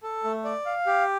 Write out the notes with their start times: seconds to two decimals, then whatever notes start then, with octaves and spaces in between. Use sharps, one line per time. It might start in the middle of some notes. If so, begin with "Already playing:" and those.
0.03 A4
0.24 A3
0.45 D5
0.66 F5
0.87 G4